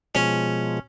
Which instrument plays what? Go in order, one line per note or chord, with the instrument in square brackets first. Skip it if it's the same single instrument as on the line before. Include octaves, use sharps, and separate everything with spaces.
[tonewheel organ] B2 F3 G#3 [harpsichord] C#4